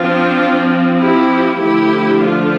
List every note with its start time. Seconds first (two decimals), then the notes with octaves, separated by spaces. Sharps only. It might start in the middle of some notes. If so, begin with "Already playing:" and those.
Already playing: F3 C4 D4 F4
0.99 E4 G4
1.60 D3 F3 A3 E4 G4
2.21 D4 F4